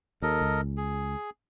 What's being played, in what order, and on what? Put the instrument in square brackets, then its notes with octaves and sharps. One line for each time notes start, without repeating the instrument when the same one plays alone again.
[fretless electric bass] D#2 [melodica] A4 A#4 D#5
[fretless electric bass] C#2
[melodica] G#4